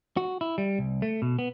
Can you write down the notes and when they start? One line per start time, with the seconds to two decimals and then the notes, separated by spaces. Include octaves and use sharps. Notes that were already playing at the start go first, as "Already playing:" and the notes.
0.17 F#4
0.41 E4
0.58 G3
0.79 C2
1.02 A3
1.22 B2
1.39 B3